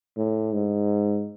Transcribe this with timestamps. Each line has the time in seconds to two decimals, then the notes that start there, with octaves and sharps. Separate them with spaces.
0.16 A2
0.53 G#2